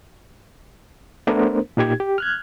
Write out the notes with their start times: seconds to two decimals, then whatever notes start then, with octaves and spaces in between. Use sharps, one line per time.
1.27 A3 B3 D4 A#4 C5
1.77 A#2 D#4 G4 G#6
2.00 G4
2.18 F6 F#6 G#6